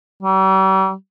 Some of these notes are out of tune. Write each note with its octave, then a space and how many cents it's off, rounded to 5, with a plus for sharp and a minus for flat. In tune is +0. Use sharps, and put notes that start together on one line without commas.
G3 -45